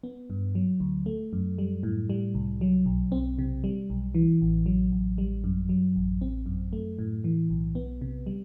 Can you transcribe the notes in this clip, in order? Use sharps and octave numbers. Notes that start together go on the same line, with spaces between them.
B3
G2
F#3
D2
A3
F#2
G3
A2
G3
C2
F#3
B1
C4
C3
G3
B1
E3
A1
F#3
A1
G3
F#2
F#3
A1
C4
F#2
A3
A2
E3
B1
B3
C3
G3